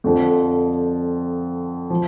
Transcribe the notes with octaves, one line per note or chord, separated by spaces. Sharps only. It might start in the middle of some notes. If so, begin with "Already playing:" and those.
F2 D3 F3
F3